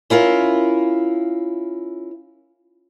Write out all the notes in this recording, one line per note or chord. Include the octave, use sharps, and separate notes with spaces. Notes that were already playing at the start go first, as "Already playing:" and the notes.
C#4 E4 F4 A#4